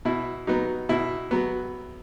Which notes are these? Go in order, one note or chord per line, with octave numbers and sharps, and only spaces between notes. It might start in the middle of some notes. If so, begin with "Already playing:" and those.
B2 E4
F#3 B3 D#4
B2 E4
F#3 B3